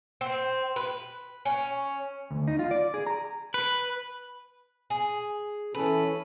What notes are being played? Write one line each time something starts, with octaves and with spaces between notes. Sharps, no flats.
C4
B4
C#4
D2
D#4
F4
D5
G#4
A#5
B4
G#4
E3 C#4 A4 B4